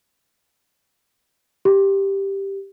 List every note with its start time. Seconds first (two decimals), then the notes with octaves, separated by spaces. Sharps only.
1.65 G4